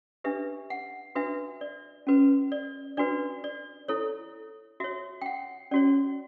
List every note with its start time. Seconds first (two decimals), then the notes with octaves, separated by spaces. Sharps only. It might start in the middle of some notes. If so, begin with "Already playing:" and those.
0.24 D4 G4 B4 E5
0.70 F#5
1.15 D4 F#4 B4 E5
1.61 D5
2.07 C#4 F#4 B4
2.52 D5
2.97 D4 F#4 B4 D5
3.44 D5
3.88 E4 A4 C#5
4.80 F#4 C#5 E5
5.21 G5
5.26 F#5
5.71 C#4 F#4 C#5 D5